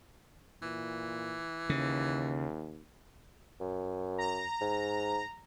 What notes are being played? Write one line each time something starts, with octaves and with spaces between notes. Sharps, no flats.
A#2 E3
D#2 C#3
F#2
A#5
G#2